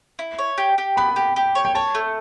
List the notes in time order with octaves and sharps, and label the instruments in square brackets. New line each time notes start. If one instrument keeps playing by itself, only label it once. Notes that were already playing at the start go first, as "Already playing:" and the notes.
[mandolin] E4
C#5
G4
G4
[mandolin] B3 [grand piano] B5
[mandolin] G4
G4
C#5
[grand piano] G5
[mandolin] C#5 [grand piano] A5
[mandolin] A3